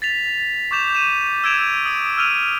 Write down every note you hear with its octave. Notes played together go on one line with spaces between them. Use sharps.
A6 B6 F7
C#6 D6 G6 E7 F7
D#7 E7
E6 G#6 D7 E7 F7
D#6 D7
E6 F6 D#7 F7